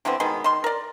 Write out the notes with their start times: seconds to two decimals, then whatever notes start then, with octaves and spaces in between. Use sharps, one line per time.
0.05 D3 E3 B3 C4
0.20 B2 D#3 G#3 B3
0.44 D#3 C6
0.64 A#4 D5